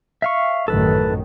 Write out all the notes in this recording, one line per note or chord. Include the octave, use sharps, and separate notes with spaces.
E5 F5 C#6
A1 F#2 D#3 A4 B4